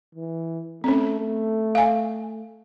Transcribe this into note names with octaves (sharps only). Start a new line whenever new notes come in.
E3
A3 C4 C#4
A3
F5 G#5